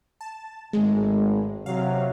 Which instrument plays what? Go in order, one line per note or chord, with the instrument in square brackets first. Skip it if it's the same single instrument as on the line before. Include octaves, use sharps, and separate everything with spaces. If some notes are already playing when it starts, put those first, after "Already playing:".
[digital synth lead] A5
[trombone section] G#1 A2 [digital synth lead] G#3
[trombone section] C3 F#3 [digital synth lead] F5